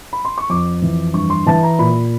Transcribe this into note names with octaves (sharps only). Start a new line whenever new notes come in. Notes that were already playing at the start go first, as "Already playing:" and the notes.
B5
C6
C#6
F2 D6
E3
G2 C#6
C6
E3 A5
A#5
A#2 B5